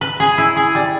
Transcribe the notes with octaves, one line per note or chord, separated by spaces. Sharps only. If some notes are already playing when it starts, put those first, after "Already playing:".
B4
G#4
E4
G#4
G3